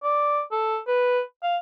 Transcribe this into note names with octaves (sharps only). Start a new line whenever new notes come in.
D5
A4
B4
F5